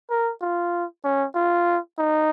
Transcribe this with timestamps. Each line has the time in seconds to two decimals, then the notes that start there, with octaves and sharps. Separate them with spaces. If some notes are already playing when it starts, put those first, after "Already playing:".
0.11 A#4
0.42 F4
1.04 C#4
1.35 F4
1.98 D#4